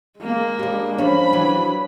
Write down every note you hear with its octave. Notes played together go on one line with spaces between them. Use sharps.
G#3 A#3
G3 D4
F3 G#3 C#4 D4 B5
E3 F#3